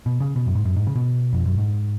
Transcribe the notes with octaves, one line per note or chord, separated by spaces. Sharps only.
B2
C#3
B2
F#2
G#2
F#2
G#2
C#3
B2
F2
F#2
G#2